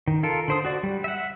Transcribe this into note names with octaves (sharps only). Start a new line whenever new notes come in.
D#3
F4 A4 A#4
D3 C5 D#6
F#4 D5
G3
E5 F#5